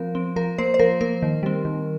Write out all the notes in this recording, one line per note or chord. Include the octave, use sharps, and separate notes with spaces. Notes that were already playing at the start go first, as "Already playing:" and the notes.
Already playing: F3 C4 A#4
C4
F3 A#4
A#3 C5
C5
F3 A#4
A#3 A#4
D#3
G3 C4
D#3